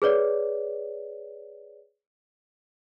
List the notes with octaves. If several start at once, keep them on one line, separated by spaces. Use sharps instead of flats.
G#4 B4 C#5 D5